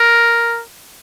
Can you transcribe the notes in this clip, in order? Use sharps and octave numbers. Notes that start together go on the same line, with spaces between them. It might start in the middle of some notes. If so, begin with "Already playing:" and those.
Already playing: A#4